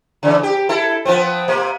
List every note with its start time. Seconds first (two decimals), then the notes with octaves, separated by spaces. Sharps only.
0.23 C#3 E3
0.43 G4
0.69 E4 A4
1.05 F3 B3 C4
1.48 C3 A#3